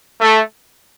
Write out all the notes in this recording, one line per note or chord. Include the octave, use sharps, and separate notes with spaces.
A3